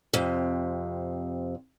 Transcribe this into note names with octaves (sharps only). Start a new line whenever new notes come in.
F2 C3